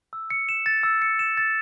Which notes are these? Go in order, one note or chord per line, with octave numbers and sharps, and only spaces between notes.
E6
C#7
E7
A6
E6
C#7
E7
A6